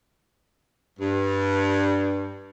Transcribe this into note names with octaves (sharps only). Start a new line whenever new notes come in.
G2